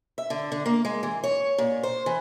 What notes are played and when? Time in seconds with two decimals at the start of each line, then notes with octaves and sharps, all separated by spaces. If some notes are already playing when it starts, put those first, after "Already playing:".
0.18 E5
0.30 D3
0.52 D3
0.66 A#3
0.85 G#3
1.03 E3
1.24 C#5
1.58 A#2
1.83 C5
2.06 E3